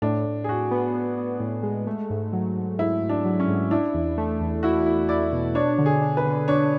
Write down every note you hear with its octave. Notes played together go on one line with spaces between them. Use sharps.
A2 D4
A2
G#4
A2 F#4
B3
B3
B3
A2
G#3
A3
G#2
F#3
G#2
G#2 E4
G#2
D4
F#3
C#4
G#2
D4 E4
E2
A3
E2
E4 F#4
E4
E4 D5
B2
D4 C#5
D3
G#4
D4
B4
D3
D4 C#5